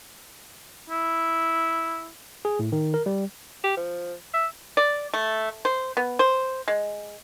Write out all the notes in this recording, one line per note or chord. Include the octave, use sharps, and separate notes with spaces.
E4
G#4
A2
D#3
A#4
G3
G4
F3
E5
D5
A3
C5
B3
C5
G#3